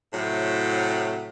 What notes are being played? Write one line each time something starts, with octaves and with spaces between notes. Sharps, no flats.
A2 C3 F#3